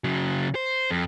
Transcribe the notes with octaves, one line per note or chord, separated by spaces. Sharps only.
C#3 F#3
C5
F2